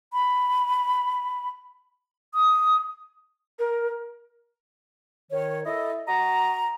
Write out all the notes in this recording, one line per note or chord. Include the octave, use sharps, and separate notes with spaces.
B5
D#6
A#4
D#3 C#5
E4 A4 D#5
F#4 D#5 A#5